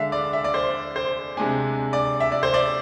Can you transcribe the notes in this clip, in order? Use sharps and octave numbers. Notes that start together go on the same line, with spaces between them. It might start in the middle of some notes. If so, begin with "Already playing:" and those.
Already playing: D3 G#3 D4 E5 F5
D5
E5
D5
C5
C5
C3 G#3 D4 G#5
D5
E5
D5
C5
D5